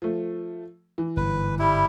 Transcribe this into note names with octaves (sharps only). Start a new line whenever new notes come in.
F3 A3
E3
G1 G#2 B4
G3 E4